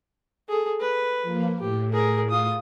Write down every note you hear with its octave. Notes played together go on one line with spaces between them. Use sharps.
G#4 A4
B4
F3 A#3
A2 G4
G#4 A#4
F4 D#6